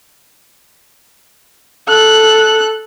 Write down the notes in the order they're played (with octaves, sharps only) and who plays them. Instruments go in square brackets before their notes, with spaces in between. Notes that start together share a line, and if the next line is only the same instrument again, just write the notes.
[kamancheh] A4 F#6